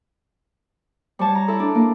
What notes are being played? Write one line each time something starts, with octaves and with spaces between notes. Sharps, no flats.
G3 C#5 A5
A#5
E4 A4
D4
A#3